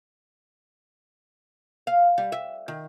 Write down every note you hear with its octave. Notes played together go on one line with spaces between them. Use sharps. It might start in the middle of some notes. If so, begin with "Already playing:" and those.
F5
G3
E5
D#3